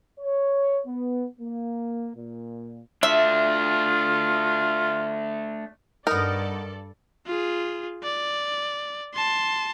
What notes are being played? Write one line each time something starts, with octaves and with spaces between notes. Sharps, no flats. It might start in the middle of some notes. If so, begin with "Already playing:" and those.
C#5
B3
A#3
A#2
A3 D4 F4 E5
G2 B3 D#4 A4 A#4 D5
F4 G#4
D5
A5 C6